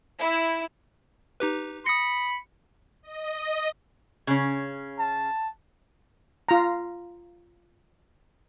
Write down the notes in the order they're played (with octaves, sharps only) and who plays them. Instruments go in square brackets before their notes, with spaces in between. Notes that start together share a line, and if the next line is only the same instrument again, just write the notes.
[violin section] E4
[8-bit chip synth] D#4 G4 B4
[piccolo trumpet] B5 [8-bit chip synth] D#6 A#6 [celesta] C#7
[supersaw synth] D#5
[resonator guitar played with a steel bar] C#3 C#4
[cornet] A5
[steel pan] F4 A#5